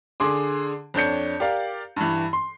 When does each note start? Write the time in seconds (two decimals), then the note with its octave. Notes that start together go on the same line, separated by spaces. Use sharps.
0.20 D3 G#4 C6 D6
0.94 F2 D4 C#5 G6 C#7
1.40 G4 A#4 D5 F5
1.96 G2 E3
2.33 C6